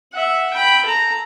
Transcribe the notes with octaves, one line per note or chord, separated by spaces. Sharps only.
E5 F#5
G5 B5
A4 A#5